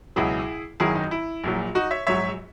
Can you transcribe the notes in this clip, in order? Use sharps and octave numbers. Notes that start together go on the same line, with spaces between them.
C#2 B2 F#3 E4 G#4
G#1 F#2 D#3 F#3 E4 G#4
D#4
E4
A#1 A#2 F#3
D#4 F#4
C#5 E5
A#1 G#2 F#3 C#5 E5